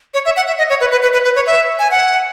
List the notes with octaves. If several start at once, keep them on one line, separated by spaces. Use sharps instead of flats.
C#5
E5
F#5
E5
D#5
C#5
B4
B4
B4
B4
B4
C#5
E5
G#5
F#5